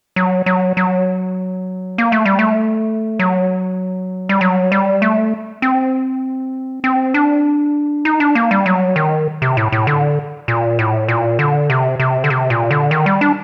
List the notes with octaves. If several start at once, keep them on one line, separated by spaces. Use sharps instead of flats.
F#3
F#3
F#3
A#3
A3
G3
A3
F#3
G3
F#3
G3
A3
C4
C4
D4
D#4
D4
A#3
G3
F#3
D#3
C3
A2
A2
D3
A#2
A2
A#2
D3
C3
C3
D3
C3
A#2
D3
D#3
G3
D4